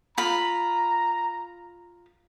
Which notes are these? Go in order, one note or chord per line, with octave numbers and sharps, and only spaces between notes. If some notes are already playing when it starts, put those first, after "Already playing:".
F4 A#5 B5